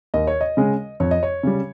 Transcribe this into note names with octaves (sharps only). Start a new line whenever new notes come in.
D#2 D#5
C#5
D#5
C#3 G#3
F2 C#5
D#5
C#5
C#3 G3